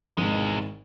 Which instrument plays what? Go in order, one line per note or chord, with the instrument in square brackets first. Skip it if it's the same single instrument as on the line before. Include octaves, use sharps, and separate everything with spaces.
[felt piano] G#1 D#4 [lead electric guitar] E2 G#3